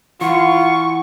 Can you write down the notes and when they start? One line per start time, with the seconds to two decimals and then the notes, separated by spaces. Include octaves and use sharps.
0.21 E3 F4 F#5 C#6